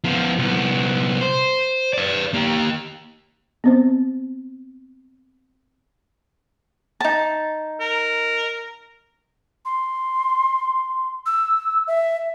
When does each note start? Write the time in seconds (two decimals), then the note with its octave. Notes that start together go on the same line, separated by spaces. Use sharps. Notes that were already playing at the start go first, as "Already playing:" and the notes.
0.04 F3 B3
0.39 C2 B3
1.21 C5
1.93 B4 D5
2.33 A#3 G4
3.64 B3 C4 C5
7.00 D#4 A5
7.81 A#4
9.65 C6
11.26 E6
11.87 E5